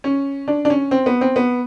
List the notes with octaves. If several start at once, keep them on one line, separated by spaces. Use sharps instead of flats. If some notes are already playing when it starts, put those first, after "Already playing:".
C#4
D4
D4
C#4
C4
B3
C4
B3